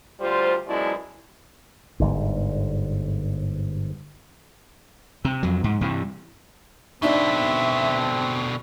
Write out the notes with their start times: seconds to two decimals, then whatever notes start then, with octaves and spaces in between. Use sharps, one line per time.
0.20 D2 G3 F4 C5
0.67 F#2 B2 F3 G#3 E4 D5
2.00 G1 G#2
5.25 C3
5.43 F2 F#3
5.64 G#2
5.81 G2 C3 E3
7.02 B2 D3 C4 D4 D#4 E5